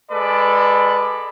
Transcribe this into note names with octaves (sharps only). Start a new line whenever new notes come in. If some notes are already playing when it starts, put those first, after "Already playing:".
G#3 A4 B4 D5